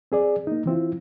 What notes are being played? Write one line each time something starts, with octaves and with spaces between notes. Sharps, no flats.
C4 G#4 D5
A#3 D#4
E3 C4 E4 F4